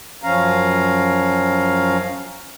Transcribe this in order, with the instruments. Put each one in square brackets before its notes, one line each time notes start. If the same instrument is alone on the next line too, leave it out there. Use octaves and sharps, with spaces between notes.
[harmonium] F#2 F3 C#4 F5 A#5